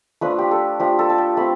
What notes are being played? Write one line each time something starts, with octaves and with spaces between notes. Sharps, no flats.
F3 A3 D4 B4
G4
A4
F3 A3 D4 G4
A4
A5
G5
A3 C4 B5